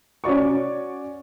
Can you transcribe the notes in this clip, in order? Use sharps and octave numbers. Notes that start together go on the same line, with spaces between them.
C#4 F#4 D5 C#6